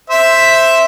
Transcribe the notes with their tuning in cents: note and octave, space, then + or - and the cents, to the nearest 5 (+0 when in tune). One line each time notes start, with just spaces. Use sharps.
C5 +0 E5 +0